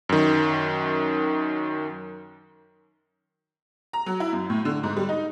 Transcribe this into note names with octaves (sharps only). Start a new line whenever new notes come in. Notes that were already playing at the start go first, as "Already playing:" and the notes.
F#2 D#3
A#5
F#3
E4
F#2
A2
D3
G#2
G3
D#4